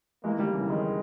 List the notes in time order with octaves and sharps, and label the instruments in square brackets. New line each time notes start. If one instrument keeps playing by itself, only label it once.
[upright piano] E3 G#3 [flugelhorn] A#3
[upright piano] D#3 G3
C#3 E3
[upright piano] D#3 [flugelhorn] G#3